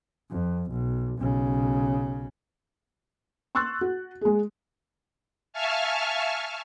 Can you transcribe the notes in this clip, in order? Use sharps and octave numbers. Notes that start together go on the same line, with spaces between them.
F2
B1
B1 C#3
C6 C#6 E6 F#6 A6
F#4
G#3 G#4
E5 F5 G#5 A5 C#6 F6